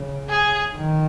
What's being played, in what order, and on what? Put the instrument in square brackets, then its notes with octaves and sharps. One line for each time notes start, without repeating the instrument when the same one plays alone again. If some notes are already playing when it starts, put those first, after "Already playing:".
Already playing: [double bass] C#3
[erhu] G#4
[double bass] D#3